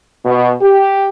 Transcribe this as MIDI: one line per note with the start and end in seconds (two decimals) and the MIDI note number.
0.25 0.54 47
0.61 1.08 67